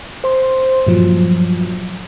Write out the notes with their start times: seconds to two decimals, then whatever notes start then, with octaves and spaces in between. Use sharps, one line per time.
0.24 C5 C6
0.87 G2 A#2 F3 F#3